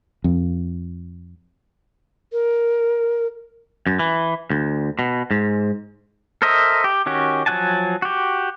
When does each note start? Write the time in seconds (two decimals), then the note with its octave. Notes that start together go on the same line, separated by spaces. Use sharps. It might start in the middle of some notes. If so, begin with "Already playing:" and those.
0.24 F2
2.32 A#4
3.87 F#2
3.99 E3
4.50 D2
4.99 B2
5.31 G#2
6.42 A4 A#4 C5 D#5 E5
6.84 G4
7.06 D#3 C#4 F#4 G4
7.46 F3 F#3 F#5 G#5 A5
8.02 F#4 G4